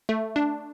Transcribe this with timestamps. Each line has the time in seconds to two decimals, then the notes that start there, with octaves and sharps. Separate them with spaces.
0.09 A3
0.36 D4